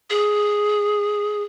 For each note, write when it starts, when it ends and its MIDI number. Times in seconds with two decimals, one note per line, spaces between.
0.10 1.42 68